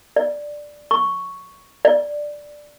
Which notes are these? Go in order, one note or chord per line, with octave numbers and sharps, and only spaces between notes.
D5
C#6
D5